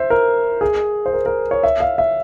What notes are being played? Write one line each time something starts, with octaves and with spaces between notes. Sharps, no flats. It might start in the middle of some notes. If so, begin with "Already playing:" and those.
Already playing: C5 E5
A#4
G#4
C5
A#4
A#4
C#5
E5
F5
E5